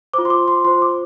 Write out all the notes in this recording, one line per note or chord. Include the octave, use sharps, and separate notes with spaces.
F4 C5 D6
C6
D6
C6
F4 C5 C6
D6